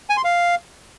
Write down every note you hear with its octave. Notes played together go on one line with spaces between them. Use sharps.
G#5
C6
F5